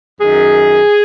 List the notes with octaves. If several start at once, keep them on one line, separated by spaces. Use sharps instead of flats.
F#2 D#3 G#4